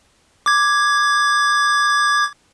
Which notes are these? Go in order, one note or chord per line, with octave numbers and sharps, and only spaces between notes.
D6 G#6